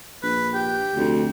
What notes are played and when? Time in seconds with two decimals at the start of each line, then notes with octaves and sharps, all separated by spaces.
0.23 A#1 B4
0.54 G4 G5
0.96 F1 D2